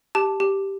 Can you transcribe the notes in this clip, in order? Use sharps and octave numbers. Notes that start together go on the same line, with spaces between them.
G4 A5
G4